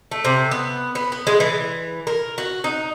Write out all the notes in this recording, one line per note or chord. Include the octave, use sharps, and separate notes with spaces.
A3
C3
B3
B3
B3
G#3
E3
A#4
F#4
D#4